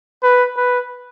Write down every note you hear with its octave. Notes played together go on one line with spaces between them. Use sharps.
B4
B4